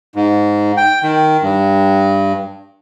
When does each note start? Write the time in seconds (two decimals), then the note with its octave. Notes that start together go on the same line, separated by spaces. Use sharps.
0.16 G#2
0.77 G5
1.03 D#3
1.42 G2